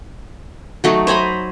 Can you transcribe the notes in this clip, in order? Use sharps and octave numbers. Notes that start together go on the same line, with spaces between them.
F#3 A3 D#4
C5 G#5 A#5 B5